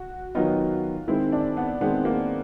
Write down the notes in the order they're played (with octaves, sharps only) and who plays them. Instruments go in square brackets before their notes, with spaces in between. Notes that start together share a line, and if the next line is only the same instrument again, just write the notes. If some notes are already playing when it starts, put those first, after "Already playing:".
Already playing: [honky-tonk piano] F#4
[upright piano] D#3 F#3 B3 D#4 [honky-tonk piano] F4
[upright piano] D#3 G#3 C4 [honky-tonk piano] E4
[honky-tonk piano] D4
B3
[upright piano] D#3 G#3 C4 [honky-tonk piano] B3
[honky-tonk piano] A#3